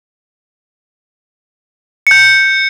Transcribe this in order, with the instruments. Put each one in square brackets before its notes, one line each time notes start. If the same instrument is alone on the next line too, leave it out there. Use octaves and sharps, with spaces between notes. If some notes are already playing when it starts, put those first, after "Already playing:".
[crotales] G6 C#7